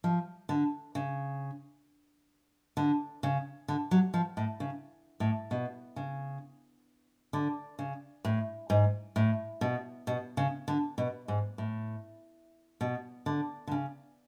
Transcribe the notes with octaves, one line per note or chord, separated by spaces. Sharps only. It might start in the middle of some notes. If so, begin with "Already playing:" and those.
F3
D3
C#3
D3
C#3
D3
F#3
F3
A2
C#3
A2
B2
C#3
D3
C#3
A2
G#2
A2
B2
B2
C#3
D3
B2
G#2
A2
B2
D3
D3
C#3